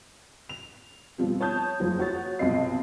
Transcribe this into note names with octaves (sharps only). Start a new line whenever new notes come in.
F7
B2 F3 G3 C4
C#5 A5 D#6 G6 G#6
F#1 F3 F#3 F4 C5
F#4 C#5 A6
B1 C3 F3 C4 D#5 C7